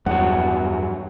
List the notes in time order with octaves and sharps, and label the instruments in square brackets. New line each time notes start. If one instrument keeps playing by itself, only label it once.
[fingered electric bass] E2 [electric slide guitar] G2 F#3 [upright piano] F#5